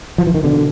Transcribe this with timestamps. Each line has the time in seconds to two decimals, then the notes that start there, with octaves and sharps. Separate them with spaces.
0.18 F3
0.27 E3
0.34 D#3
0.43 B2 D3